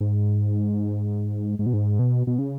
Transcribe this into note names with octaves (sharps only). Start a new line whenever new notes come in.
G#2
G#2
B2
G#2
B2
B2
C#3